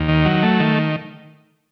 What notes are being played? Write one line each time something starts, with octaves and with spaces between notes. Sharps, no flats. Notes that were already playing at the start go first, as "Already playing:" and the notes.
Already playing: D#2
D#3
F#3
A3
D#3